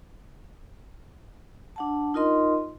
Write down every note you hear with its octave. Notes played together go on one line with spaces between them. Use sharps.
D4 F#5 A5
D#4 F4 A#4 D#5 C6